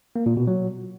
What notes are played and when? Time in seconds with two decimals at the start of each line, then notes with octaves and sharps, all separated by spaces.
0.16 A#3
0.26 A#2
0.37 B2
0.47 F#3